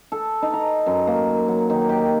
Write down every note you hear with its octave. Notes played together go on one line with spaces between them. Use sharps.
A4
D#4
A#5
F#2
A#3
F#3
D#3
G4